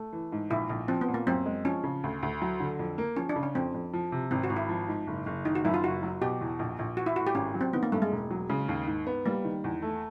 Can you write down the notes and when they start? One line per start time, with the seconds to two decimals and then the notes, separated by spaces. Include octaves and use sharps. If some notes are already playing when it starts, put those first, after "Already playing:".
Already playing: A3
0.13 E3
0.32 G#2
0.50 A#1 E4
0.69 A#1
0.88 F3 C4
1.01 B3
1.08 A#2
1.14 A#3
1.27 F#2 C4
1.46 G#3
1.65 F3 C#4
1.84 C#3
2.04 D2
2.23 D2
2.42 F#3
2.60 D3
2.79 F2
2.98 A#3
3.17 F3 C#4
3.29 D4
3.36 C#3
3.43 C#4
3.55 F2 C4
3.74 F2
3.93 F3
4.12 C3
4.31 G#1 C4
4.43 F#4
4.50 G#1
4.56 E4
4.69 F3
4.88 G#2
5.07 F#1
5.26 F#1
5.45 D#3 D#4
5.55 F#4
5.65 F#2 E4
5.74 F4
5.83 F#1 F#4
6.03 F#3
6.21 B2 G4
6.41 E2
6.59 A#1
6.79 A#1
6.97 E3 F#4
7.06 E4
7.16 A2 F#4
7.27 G4
7.35 G#1 C#4
7.54 F#3
7.61 C4
7.73 D#3 B3
7.83 A#3
7.92 G2 A3
8.02 G#3
8.12 E1
8.31 F#3
8.49 C#3 G#3
8.69 D#2
8.87 G#2
9.07 B3
9.26 G3 A#3
9.45 D#3
9.64 E2
9.82 A3